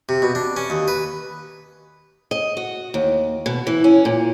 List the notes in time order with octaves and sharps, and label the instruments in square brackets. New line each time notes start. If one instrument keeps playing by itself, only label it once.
[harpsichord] C3
B2
D4
C#4
D#2
B4
[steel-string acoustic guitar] D#5
F#4
D#2
B2
E3
C#4
A#2